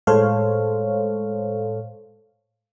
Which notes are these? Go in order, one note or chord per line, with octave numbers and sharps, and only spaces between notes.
A2 G#3 A4 C5 C#5 F5